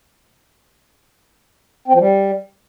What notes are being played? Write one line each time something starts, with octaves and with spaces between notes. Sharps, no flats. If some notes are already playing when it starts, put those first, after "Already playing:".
C4
F3
G3